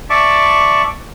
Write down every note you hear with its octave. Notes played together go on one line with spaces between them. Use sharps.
D5 E5 A5 C#6 D6